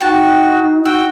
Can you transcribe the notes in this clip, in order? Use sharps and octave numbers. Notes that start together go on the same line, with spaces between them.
D#4 F#4 G5 A5
F#4 G5 E6